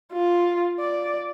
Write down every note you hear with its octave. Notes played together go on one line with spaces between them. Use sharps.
F4
D5